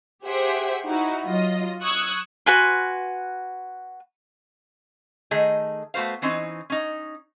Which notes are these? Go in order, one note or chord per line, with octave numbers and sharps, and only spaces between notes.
G4 G#4 C5 E5 F#5 G5
D#4 E4 F#4
F#3 F4 D#5
C#6 D#6 E6 F#6 G#6
F#4 B4 G#5 C6
D#3 A3 G#4 D#5
A3 B3 F#4 C5 F5
E3 C4 C#4 D#4
C#4 D#4